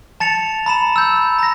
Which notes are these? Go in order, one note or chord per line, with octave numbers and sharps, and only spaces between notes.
A5 A6 C#7 F7
A#5 B5 E7
E6 G6
A#5 A#6